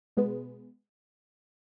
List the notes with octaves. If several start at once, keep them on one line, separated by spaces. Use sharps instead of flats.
B2 G#3 B3